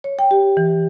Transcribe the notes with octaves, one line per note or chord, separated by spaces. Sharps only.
C#5
G5
G4
E3